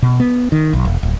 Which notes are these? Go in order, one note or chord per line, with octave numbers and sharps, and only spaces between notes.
B2
B3
D#3
B1
E1
D1